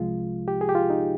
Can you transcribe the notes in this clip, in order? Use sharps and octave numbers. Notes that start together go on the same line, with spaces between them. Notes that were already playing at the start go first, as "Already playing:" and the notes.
Already playing: C2 C3 F3 G#3 F4
G4
G#4
G4
F4
D#4